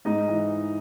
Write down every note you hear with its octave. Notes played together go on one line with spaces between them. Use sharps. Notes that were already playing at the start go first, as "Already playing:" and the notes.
G#2 D#4 D#5
E3